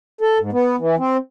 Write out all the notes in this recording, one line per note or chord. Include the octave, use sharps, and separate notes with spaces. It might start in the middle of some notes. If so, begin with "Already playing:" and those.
A4
G#2
B3
E3
C4